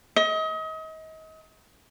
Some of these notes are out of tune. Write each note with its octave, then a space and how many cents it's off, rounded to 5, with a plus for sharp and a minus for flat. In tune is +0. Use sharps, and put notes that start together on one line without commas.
D#5 +35